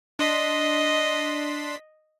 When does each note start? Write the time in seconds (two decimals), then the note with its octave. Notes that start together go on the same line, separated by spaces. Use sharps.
0.19 D4 D#5 C6 B6